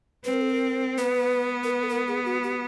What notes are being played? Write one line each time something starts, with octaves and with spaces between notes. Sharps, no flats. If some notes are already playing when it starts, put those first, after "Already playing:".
C4 B4
A#4
A4
A#4
B3 B4
A#4
B4
A4
A#4
G#4
F#4
G4